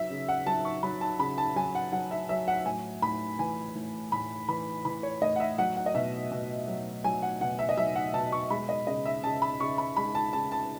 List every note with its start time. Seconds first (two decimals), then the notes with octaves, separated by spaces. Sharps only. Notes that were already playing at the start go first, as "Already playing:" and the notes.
Already playing: F#3 E5
0.10 C#3
0.28 F#5
0.46 F#3 A5
0.65 C#6
0.83 F#3 B5
1.01 A5
1.19 C#3 B5
1.38 A5
1.56 F#3 G#5
1.75 F#5
1.92 F#3 F#5
2.11 E5
2.29 F#3 E5
2.48 F#5
2.66 A2 G#5
3.02 A2 B5
3.39 E3 G#5
3.75 A2
4.12 A2 B5
4.48 E3 B5
4.85 E3 B5
5.03 C#5
5.22 A2 D#5
5.36 F#5
5.40 E5
5.58 F#3 F#5
5.76 F#5
5.86 D#5
5.95 B2 E5
6.31 B2
6.68 F#3
7.04 F#3 G#5
7.22 F#5
7.41 B2 F#5
7.59 E5
7.69 D#5
7.77 F#3 E5
7.95 F#5
8.14 B2 A5
8.32 C#6
8.50 G#3 B5
8.69 D#5
8.87 C#3 D#5
9.05 E5
9.24 C#3 A5
9.42 B5
9.60 C#3 C#6
9.78 B5
9.97 G#3 B5
10.15 A5
10.33 C#3 A5
10.52 A5